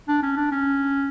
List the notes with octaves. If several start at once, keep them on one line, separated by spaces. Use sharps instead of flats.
D4
C#4
D4
C#4